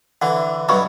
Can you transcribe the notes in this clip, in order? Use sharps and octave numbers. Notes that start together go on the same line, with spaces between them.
D3 E3 F#5
G2 B2 F#3 B5 C#6